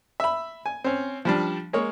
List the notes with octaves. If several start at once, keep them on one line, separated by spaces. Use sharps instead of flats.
E5 B5
G#5
C4 C#4
F3 G3 D4
G#3 A#3 C#5